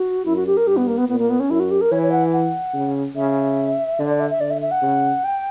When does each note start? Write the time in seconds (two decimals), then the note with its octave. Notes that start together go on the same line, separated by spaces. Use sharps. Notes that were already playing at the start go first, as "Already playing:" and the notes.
Already playing: F#4
0.25 F#2 E4
0.36 F#4
0.47 G4
0.57 A#4
0.67 G2 G4
0.77 B3
0.87 A#3
0.97 B3
1.09 A#2 B3
1.19 A#3
1.30 B3
1.40 C#4
1.50 F#2 E4
1.60 F#4
1.71 G4
1.81 A#4
1.91 E3 C#5
2.02 C#5
2.12 F#5
2.33 F#5
2.74 C#3
3.16 C#3 E5
3.99 D3 D5
4.10 D5
4.20 E5
4.30 E5
4.40 D3 D5
4.50 E5
4.62 E5
4.71 F#5
4.82 C#3
5.24 G5